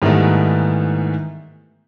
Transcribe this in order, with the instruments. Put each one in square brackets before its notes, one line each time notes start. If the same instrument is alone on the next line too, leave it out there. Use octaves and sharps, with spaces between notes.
[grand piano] G#2 D#3 E3 G3 A3 B3